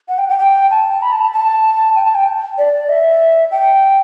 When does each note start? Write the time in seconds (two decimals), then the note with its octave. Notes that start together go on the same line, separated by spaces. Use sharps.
0.08 F#5
0.18 G5
0.29 G5
0.39 G5
0.71 A5
1.02 B5
1.12 A5
1.23 A5
1.33 A5
1.96 G5
2.05 A5
2.15 G5
2.58 D5
2.89 E5
3.51 G5